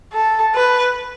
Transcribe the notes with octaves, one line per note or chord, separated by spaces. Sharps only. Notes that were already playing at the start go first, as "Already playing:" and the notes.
A4
B4